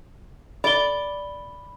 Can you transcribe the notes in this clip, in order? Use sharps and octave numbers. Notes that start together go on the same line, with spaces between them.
D5 B5 G7